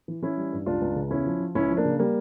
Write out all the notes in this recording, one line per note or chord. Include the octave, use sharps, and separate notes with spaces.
E3
E3 C#4 E4
G3
G2
C#2 D4 F4
C#2
C#3
E2 C#4 E4
F3
F3
C#2 C#4 E4
F3
A#3 D4
C#3
G3 A#3